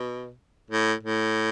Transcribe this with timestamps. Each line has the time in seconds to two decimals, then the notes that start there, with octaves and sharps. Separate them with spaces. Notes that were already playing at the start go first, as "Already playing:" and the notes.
Already playing: B2
0.70 A2
1.03 A2